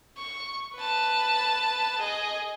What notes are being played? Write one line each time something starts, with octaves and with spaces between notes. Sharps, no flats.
C#6
B4 A5
G#4 D#5